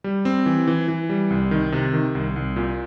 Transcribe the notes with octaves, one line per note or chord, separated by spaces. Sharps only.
G3
C4
E3
E3
E3
G3
C2
D#3
C3
D#3
C2
C2
A#2